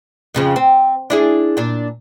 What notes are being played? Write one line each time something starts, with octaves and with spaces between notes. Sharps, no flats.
F2 C#3 F3
C4
D4 E4 G#4
A#2 D4